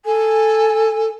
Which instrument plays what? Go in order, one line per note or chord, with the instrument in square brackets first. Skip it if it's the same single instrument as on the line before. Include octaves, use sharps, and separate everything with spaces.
[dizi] A4 [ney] G#5